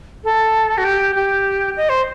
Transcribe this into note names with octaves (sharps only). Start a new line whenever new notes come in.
A4
F#4
G4
G4
D#5
C5